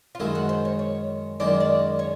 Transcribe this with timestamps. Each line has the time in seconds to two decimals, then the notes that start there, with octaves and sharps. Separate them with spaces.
0.15 F4
0.20 F#2 D#3 G#3 E4
0.35 F#4
0.49 C5
0.65 C#5
0.79 C#5
1.40 F#2 D#3 G#3 B3 D5
1.60 D5
1.99 C#5